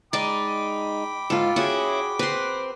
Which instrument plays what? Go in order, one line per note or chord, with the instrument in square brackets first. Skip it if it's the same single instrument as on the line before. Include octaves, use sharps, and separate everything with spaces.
[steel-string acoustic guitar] G#3 D#4 [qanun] D5 [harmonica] G5 B5 D6
[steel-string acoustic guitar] G#2 [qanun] F4 A4
[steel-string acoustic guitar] C#4 E4 [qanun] F#4 G#4
[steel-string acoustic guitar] C4 [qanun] B4 C6